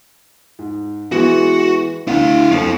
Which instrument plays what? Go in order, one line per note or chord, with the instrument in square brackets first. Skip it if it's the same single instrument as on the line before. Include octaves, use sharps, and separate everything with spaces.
[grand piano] G#2
[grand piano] E3 G#3 B3 [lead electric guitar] F#4
[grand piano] D2 D3 [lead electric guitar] E4 F5
[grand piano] F#1 F2 [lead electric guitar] F4 A4